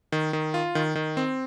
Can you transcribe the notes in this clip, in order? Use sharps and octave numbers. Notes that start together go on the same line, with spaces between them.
D#3
D#3
F4
D#3
D#3
C4